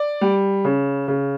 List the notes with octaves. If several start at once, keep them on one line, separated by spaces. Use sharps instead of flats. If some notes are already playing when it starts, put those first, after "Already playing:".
Already playing: D5
G3
C#3
C#3